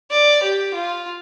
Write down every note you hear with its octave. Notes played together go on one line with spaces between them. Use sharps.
D5
G4
F4